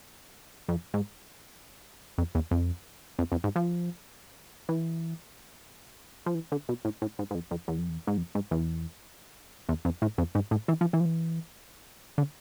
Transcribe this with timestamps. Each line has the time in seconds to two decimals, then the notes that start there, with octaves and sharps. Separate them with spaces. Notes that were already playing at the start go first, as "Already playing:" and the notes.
0.68 F2
0.94 G#2
2.18 F2
2.35 E2
2.51 F2
3.18 F2
3.32 F2
3.44 G#2
3.56 F3
4.69 E3
6.26 F3
6.35 E3
6.52 D3
6.69 B2
6.85 A2
7.02 A2
7.19 G#2
7.31 G#2
7.35 F2
7.51 F2
7.68 E2
7.78 F2
7.89 E2
8.07 G#2
8.18 F2
8.35 G#2
8.51 E2
9.69 E2
9.85 F2
10.02 A2
10.18 F2
10.35 G#2
10.51 A2
10.68 E3
10.81 F3
10.93 E3
11.00 F3
11.06 E3
12.18 D3